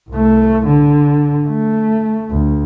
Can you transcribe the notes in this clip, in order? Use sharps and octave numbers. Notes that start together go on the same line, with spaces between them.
C2 A3
D3
A3
D2